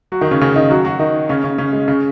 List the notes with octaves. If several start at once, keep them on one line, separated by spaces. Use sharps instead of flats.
F#3 F#4
D#3 D#4
C#3 C#4
C#3 C#4
D#3 D#4
F#3 F#4
F#3 F#4
D#3 D#4
C#3 C#4
C#3 C#4
C#3 C#4
G#3
C#3 C#4